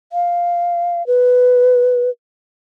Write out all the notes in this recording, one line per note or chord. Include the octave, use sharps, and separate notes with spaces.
F5
B4